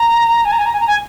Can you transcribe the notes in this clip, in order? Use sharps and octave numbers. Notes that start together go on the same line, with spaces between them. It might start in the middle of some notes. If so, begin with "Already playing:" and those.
Already playing: A#5
G#5
A#5
G#5
A#5
G#5
A#5
G#5